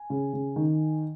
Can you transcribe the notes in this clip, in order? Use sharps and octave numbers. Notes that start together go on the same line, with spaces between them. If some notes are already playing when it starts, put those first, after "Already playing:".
Already playing: G#5
C#3
C#3
D#3